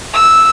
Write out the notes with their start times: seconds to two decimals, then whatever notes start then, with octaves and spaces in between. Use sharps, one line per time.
0.14 E6